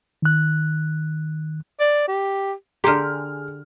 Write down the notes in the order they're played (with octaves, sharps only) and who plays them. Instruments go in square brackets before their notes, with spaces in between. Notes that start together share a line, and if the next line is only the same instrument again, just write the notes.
[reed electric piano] D#3 F#6
[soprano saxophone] D5
G4
[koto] D3 G4 [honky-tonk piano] G#4 F6 [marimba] A#5 C6